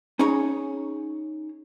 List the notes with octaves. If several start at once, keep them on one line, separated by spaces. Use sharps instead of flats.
C#4 D#4 G#4 C#5 A#5